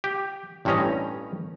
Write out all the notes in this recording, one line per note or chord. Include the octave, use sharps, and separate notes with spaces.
G4
A1 G2 C4 C#4 D#5 A#5